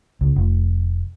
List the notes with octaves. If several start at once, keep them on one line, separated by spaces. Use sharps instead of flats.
C#2
F1